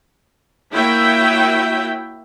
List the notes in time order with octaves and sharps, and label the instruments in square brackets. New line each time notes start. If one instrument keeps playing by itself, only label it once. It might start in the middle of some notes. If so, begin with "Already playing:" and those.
[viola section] A#3 E4 F#4 C#5 E5 G5